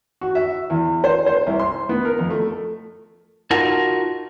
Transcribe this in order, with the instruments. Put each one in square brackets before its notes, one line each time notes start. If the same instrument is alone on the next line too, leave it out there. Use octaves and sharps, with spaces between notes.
[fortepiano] F#4
E5
E2
C5
C5
C2
C6
B3
A#4
F2
A3
[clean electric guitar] D#4 F4 F#4 A#4 A5